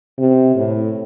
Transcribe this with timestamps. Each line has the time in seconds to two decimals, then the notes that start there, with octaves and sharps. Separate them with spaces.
0.19 C3
0.55 A2